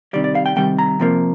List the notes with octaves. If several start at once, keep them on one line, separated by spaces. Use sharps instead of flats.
C3 D#3 G3 D5
D5
F5
G5
C3 D#3 G3 G5
A#5
C3 F3 A#3